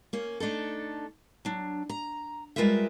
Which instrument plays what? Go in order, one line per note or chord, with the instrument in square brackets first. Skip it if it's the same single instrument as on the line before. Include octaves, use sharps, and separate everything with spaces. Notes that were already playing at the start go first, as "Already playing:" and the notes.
[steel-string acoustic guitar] A#3 C#4
A3 D4 D#4 A4
F#3 D4
A#5
G3 G#3 F4 A#4 B4 E5